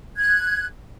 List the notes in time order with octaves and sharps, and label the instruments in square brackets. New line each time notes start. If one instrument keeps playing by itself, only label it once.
[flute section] F#6 G#6